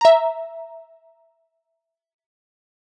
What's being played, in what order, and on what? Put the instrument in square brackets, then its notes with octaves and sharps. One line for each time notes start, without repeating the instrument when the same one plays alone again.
[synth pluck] E5 A#5